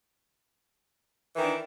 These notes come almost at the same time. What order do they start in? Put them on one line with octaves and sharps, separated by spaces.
E3 D#3 D4